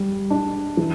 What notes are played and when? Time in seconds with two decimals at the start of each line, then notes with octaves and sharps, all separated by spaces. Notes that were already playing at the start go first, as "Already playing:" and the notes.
Already playing: G3
0.30 D4
0.77 E3